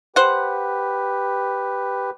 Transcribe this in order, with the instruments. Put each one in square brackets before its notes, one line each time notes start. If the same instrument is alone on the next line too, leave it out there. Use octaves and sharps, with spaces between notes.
[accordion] G4 B4 [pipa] C5 F#5